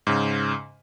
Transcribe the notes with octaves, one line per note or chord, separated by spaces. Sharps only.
G#2 C#3